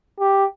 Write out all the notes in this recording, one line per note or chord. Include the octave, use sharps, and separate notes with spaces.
G4